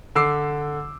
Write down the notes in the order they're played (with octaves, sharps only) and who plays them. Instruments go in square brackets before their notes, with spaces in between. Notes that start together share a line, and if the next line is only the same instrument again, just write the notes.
[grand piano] D3 D6 E6 C7